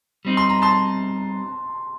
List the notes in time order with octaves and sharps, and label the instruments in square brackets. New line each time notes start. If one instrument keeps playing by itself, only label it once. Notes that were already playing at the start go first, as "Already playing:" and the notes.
[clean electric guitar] G3 C4 D#4
[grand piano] C6
A#5
A5 C6